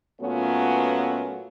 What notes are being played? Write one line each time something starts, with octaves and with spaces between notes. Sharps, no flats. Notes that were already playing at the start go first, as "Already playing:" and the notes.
A#2 F#3 A3 B3 C#4 F4